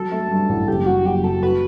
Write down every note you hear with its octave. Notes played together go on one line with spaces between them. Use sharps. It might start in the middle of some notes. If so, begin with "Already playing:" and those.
Already playing: F#3 A4
A3
G2
A1
F#1 G4
F#3 F#4
F#1 G4
F#3 A4
F#4 B4